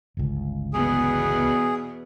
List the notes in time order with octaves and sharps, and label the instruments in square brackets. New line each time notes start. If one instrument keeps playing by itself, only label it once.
[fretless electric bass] G1 C#2
[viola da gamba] E2 B2 B3 [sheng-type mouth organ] G#4